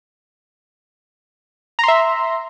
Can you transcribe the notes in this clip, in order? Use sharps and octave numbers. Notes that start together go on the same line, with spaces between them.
E5 A#5 C6